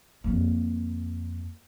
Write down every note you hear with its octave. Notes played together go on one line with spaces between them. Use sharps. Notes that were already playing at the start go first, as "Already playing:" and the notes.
F2 A#3